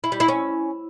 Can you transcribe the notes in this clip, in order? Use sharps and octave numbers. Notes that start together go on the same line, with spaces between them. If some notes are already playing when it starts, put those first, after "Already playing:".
E4
G3
E4
C#4